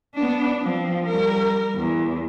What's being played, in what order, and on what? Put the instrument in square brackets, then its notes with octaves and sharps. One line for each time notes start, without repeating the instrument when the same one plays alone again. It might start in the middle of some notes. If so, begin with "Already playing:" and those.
[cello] B3 D4
F3 C4
G3 A#4
E2